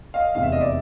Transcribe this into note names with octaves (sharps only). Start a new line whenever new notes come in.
D#5 F5
F1 E2 C3 F5
E5
D#5
D5 E5